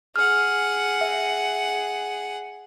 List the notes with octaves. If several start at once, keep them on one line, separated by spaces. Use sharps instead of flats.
G#4 F#5 F6
E5